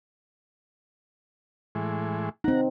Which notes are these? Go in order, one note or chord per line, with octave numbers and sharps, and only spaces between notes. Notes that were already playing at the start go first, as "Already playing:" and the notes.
A2 E3 G#3
C4 D#4 F#5 A#5